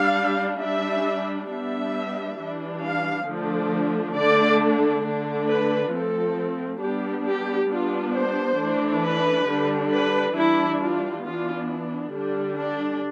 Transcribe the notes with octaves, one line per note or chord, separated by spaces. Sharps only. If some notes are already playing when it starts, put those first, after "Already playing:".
Already playing: G3 D4 F5
G3 D4 E5
G3 B3 D4 E5
E3 G3 D4
F5
D3 F3 A3 D4
D3 A3 D4 D5
D3 A3 D4
B4
F3 A3 C4 A4
G3 B3 D4 G4
G4
G3 B3 D4 F4
C5
E3 A3 D4
B4
D3 G3 D4
B4
E3 G3 D4 E4
F4
E3 B3 D4 F4
D3 G3 D4
D4